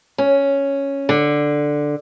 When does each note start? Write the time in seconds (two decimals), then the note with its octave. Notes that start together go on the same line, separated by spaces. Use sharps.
0.18 C#4
1.09 D3